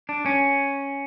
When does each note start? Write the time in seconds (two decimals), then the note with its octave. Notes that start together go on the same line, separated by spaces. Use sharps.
0.09 D4
0.26 C#4